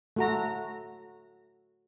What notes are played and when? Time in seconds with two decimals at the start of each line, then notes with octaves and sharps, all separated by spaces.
0.16 A3 F#4 A#5